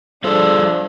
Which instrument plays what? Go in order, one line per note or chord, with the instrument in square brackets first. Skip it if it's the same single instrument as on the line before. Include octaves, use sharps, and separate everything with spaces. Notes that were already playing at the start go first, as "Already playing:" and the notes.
[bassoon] F3 [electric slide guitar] G3 G#4 A4 [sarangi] D4